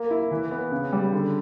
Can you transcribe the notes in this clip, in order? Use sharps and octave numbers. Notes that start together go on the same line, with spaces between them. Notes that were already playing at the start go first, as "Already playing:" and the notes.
Already playing: A#3
E4
E3
B3
C#3
G3
D3